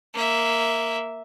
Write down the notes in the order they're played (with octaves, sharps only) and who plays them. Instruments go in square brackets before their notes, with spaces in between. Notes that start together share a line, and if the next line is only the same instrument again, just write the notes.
[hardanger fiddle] A#3 E5